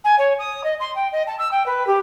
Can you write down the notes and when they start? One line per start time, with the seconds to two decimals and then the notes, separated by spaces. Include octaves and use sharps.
0.04 G#5
0.18 C#5
0.39 D#6
0.63 D#5
0.79 C6
0.95 G5
1.12 D#5
1.27 A5
1.38 E6
1.51 G5
1.66 B4
1.86 G4